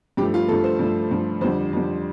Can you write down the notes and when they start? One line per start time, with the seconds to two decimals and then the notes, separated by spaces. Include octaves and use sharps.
0.17 G2 G4
0.21 F3 A3
0.34 F4
0.48 G2 F3 A3 A4
0.64 C5
0.79 G2 F3 A3
1.11 G2 F3 A3
1.41 F2 D3 G3 C5
1.73 F2 D3 G3